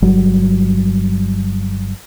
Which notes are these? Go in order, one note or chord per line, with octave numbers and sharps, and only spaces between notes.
G1 F#3 G3